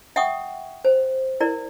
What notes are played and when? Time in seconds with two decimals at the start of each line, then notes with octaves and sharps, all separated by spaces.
0.16 E5 F#5 G5 C#6 D#6
0.85 C5
1.40 E4 A#4 D5